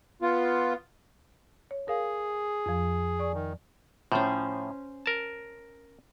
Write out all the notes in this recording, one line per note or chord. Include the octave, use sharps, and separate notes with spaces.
B3 F4
C#5
G#4 A#4 F5
F2 F3
D5 G#5 C#6
D#3
A2 F3 C#4 C5
A#4 A5